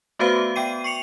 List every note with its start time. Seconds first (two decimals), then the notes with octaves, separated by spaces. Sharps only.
0.19 A3 B3 F#4 B4 C5 F5
0.56 B3 G5 C7 D#7
0.84 C#6 C7 C#7 F7